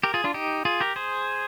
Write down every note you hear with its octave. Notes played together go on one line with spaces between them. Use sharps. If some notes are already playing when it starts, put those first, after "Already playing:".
G4 A#4
F4 G#4
D4 F4
D#4 G4
F4 G#4
G4 A#4
G#4 C5